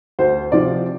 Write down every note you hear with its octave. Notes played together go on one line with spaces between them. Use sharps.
D2 C5
C3 F3 D5